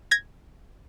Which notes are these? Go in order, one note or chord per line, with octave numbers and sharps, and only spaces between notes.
G#6 A#6